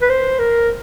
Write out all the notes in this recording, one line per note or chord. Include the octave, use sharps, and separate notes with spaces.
B4
C5
A#4